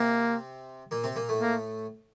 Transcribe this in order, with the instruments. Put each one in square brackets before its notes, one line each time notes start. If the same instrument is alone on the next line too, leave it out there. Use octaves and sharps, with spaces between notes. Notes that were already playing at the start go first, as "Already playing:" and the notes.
Already playing: [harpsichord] C3 C4 [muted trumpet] A#3
[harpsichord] A#2 A#3
C3 C4
A#2 A#3
A2 A3
[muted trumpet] A#3